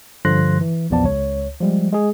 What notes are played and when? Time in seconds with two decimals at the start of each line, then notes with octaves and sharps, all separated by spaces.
0.25 G2 D3 F3 C6 F#6 A#6
0.61 E3
0.90 A#1 E2 F3 B3 D5 A5
1.04 C#2 C#5
1.60 F3 G3 G#3
1.92 G#3 G#4